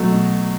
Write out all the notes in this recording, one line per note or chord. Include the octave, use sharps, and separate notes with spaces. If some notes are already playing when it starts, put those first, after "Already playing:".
Already playing: B2 F#3 A3
B2